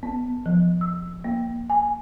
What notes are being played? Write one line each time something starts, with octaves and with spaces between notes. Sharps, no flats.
B3
F3
E6
A#3
G#5